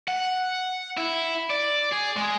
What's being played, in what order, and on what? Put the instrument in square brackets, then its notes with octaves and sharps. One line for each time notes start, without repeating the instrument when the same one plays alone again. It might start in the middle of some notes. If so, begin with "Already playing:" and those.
[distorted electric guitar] F#5
E4
D5
G#4
G#3